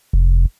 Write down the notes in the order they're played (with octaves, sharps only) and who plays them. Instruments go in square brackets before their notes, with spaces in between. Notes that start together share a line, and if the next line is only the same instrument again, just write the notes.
[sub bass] F1